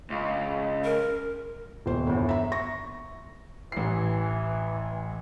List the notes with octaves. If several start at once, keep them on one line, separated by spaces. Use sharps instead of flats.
C#2
A#4
D#1 B2 C5
G1 E2
E5 A#5
C#6 A#6
A1 E3 C7